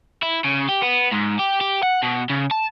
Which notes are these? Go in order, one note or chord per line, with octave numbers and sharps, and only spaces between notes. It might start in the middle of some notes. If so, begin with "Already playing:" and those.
E4
C#3
G4
B3
G#2
G4
G4
F#5
B2
C#3
A5